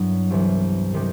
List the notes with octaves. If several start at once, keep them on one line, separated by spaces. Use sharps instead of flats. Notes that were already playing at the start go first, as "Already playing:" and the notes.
Already playing: G2 F#3 B3 E4
C2 C3 E3
C3 D#3 G3